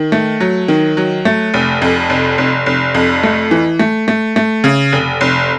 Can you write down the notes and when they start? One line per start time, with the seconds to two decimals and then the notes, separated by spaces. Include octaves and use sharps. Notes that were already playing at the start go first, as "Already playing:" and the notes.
Already playing: D#3
0.12 A3
0.40 F#3
0.68 D#3
0.97 F#3
1.25 A3
1.54 F1
1.82 F2
2.10 F1
2.38 F1
2.66 F1
2.95 F2
3.23 A3
3.51 E3
3.79 A3
4.08 A3
4.36 A3
4.64 C#3
4.92 F1
5.21 F1